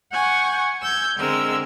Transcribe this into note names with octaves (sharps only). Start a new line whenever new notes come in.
F#5 G#5 C#6 G6
E6 G6 G#6
D3 G#3 C4 A#4 E6